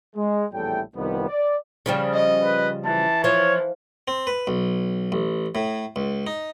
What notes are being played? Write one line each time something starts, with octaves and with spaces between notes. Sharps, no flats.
G#3
A#1 E2 A2 G3 A4 G5
C2 F2 D#3 F3 G3 B3
D5
C#3 F3 G3
D#5
B4
E3 A5
F3 C#5
C4
B4
B1
A1
A2
C#2
D#4